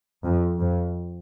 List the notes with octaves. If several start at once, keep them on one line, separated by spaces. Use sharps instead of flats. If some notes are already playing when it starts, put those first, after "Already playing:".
F2
F2